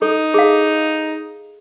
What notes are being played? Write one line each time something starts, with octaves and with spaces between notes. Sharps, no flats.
D#4 A4
G#4 F5